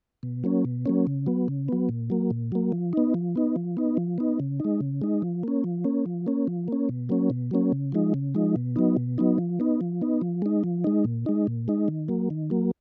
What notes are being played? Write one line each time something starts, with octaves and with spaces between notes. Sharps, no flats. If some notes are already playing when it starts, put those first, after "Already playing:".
B2
F#3 A#3 C#4
B2
F#3 A#3 C#4
C#3
F#3 B3
C#3
F#3 B3
A#2
F#3 A#3
A#2
F#3 A#3
F3
B3 D#4
F3
B3 D#4
F3
B3 D#4
F3
B3 D#4
C#3
G#3 D#4
C#3
G#3 D#4
F3
A#3 C#4
F3
A#3 C#4
F3
A#3 C#4
F3
A#3 C#4
B2
F#3 A#3 C#4
B2
F#3 A#3 C#4
C#3
F3 G#3 D#4
C#3
F3 G#3 D#4
B2
F#3 B3 D#4
B2
F#3 B3 D#4
F3
B3 D#4
F3
B3 D#4
F3
G#3 D#4
F3
G#3 D#4
A#2
G#3 D#4
A#2
G#3 D#4
D#3
F#3 A#3
D#3
F#3 A#3